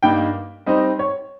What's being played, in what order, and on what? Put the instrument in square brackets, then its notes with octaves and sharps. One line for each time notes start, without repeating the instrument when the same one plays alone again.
[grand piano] G2 G3 A#3 D#4 [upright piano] G5
[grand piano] G3 C4 D#4 [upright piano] D#5
[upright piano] C#5